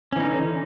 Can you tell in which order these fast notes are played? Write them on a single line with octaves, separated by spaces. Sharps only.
C#4 E3 D#4 D3